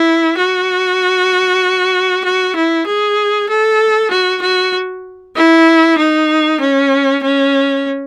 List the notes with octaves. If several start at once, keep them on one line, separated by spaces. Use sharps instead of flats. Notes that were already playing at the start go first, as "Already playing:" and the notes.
Already playing: E4
F#4
F#4
E4
G#4
A4
F#4
F#4
E4
D#4
C#4
C#4